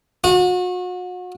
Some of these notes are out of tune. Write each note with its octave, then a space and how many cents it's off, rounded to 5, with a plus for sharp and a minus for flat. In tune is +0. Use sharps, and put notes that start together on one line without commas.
F#4 -35